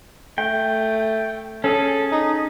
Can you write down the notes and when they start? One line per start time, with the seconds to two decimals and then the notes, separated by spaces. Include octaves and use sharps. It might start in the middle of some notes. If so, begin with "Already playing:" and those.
0.38 A3 G5
1.64 C#4 G#4 A4
2.12 D#4